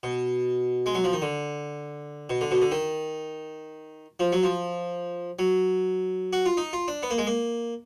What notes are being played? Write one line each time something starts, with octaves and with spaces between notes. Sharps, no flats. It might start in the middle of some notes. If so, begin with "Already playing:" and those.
B2
G#3
F#3
F3
D#3
D3
B2
D3
B2
D3
D#3
F3
F#3
F3
F#3
F#4
F4
D#4
F4
D4
B3
A#3
G#3
A#3